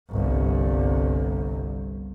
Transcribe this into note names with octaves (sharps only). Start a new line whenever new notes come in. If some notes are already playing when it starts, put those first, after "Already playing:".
G1 C2